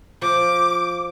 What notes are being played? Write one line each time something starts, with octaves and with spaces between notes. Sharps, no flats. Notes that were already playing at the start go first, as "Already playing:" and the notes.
F3 D6